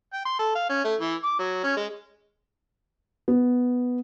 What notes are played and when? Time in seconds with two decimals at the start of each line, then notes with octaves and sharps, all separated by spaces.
0.13 G5
0.25 C6
0.39 A4
0.55 F5
0.70 C#4
0.85 A3
1.00 E3
1.23 D6
1.39 F#3
1.64 C#4
1.76 G#3
3.28 B3